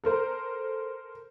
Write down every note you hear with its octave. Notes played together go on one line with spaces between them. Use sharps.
A4 A#4 C5